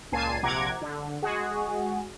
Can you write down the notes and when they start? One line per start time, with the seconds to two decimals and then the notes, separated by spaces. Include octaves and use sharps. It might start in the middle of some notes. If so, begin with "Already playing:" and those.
0.12 C#2 A#2 G#5 A5 C7 D#7
0.43 A#1 C3 F#5 A#5 D6 G#6
0.81 D3
1.22 G#3 F#4 G#4